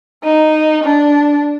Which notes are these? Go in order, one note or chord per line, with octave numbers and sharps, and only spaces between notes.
D#4
D4